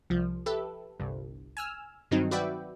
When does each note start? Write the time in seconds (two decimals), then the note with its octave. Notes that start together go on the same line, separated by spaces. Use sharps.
0.10 C2 F3
0.46 G4 A4 B4 E5
1.00 G1 C2
1.57 G#5 E6 F6
2.11 G2 D#3 F#3 C4 D#4
2.31 F#4 B4 D5 E5 G5